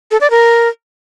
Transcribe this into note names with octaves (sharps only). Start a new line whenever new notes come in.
A4
D5
A#4